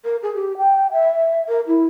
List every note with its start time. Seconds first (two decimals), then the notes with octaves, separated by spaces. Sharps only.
0.05 A#4
0.23 G#4
0.35 G4
0.58 G5
0.92 E5
1.48 A#4
1.67 E4